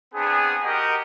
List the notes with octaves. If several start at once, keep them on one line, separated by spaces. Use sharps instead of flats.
B3 C4 D4 G#4
F#4 G4 A#4 D#5 F#5 G5